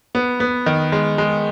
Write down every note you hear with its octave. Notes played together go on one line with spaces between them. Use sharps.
B3
B3
D#3
G#3
G#3